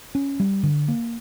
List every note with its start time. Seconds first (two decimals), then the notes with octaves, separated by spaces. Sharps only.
0.15 C#4
0.40 G3
0.63 D3
0.88 A#3